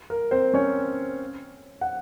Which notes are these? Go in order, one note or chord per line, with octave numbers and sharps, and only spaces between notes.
A#4
C4 C5
C#4 C#5
F#5